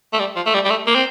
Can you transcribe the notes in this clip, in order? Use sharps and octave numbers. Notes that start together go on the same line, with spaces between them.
A3
G3
F3
A3
G3
G3
A3
A#3
C4